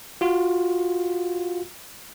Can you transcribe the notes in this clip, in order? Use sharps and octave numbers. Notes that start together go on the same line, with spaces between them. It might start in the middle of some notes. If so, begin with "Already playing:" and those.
F4 F#4